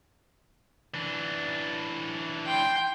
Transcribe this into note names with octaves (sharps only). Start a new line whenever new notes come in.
E3 D4
G5 C6